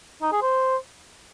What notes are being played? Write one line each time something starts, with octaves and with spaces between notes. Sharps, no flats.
D#4
G#4
C5